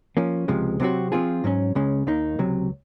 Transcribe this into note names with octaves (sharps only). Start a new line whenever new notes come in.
F3 A#3 C#4
C#2 C3 F3 G#3
C3 F#3 C4 F#4
F3 C4 F4 G#4
G#2 F#3 C#4
C#2 C#3 G#3 C#4
D#2 D#3 A#3 D#4
C#2 C3 F#3